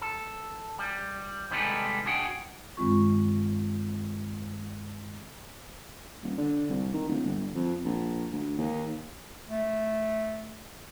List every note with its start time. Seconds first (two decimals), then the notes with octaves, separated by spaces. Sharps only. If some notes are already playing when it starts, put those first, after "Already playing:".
0.01 A4
0.79 G3
1.51 C3 D#3 G3 G#3 A4 B4
2.06 D4 F#4 G#4 F#5 G5
2.77 G2 D#3 G#3 C4 F4 C#6
6.23 D#1
6.38 D3
6.69 C2
6.93 D#3
7.09 D1
7.25 G1
7.55 F2
7.85 A#1
8.33 D2
8.58 D#2
9.49 A3